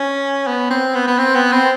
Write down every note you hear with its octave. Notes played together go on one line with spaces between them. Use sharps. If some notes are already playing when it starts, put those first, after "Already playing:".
Already playing: C#4
B3
C4
B3
B3
C4
B3
C4